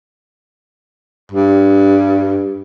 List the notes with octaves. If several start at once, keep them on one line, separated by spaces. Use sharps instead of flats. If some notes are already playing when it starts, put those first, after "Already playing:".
G2